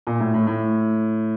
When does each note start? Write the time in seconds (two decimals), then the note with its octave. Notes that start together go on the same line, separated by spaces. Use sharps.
0.07 A#2
0.20 A2
0.34 A2
0.47 A2